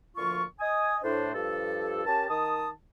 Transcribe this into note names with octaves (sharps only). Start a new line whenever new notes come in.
D2 A#2 F3 F4 C#6
D#5 G#5 D#6
A2 D4 C5
G2 F3 G4 A4
C#4 G4 A#4 A5
D#3 A5 D#6